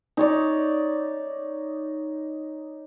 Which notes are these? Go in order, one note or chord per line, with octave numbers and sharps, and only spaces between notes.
D#4 C#5 D5